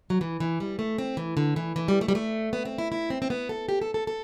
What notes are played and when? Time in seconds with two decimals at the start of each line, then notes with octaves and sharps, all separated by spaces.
0.10 F#3
0.21 E3
0.40 E3
0.60 G3
0.79 A3
0.98 C4
1.17 E3
1.37 D3
1.56 E3
1.76 E3
1.88 G3
2.01 A3
2.08 G3
2.15 A3
2.53 B3
2.65 C4
2.78 E4
2.92 E4
3.10 C4
3.22 C4
3.30 B3
3.49 A4
3.69 G4
3.82 A4
3.94 A4
4.07 A4